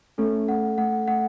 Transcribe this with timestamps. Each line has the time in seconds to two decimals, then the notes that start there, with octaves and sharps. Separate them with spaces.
0.18 A3 C#4 A4
0.48 A3 F#5
0.78 A3 F#5
1.08 A3 F#5